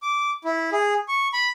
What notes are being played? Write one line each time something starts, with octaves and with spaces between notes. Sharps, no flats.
D6
E4
G#4
C#6
B5